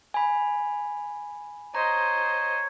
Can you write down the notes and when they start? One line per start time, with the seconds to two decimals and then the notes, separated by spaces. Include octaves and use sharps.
0.14 G#5 B5
1.75 C5 C#5 D#5 A#5